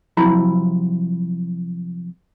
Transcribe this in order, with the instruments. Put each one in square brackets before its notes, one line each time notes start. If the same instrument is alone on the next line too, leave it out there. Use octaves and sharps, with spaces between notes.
[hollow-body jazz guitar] C3 F3 F#3 E4 A#5 B5